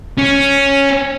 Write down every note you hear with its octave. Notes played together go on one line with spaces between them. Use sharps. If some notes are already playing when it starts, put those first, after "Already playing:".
C#4